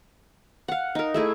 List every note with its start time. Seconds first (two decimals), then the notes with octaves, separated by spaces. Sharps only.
0.68 F5 F#5
0.95 D#4 A#4
1.14 A3 E4 G#4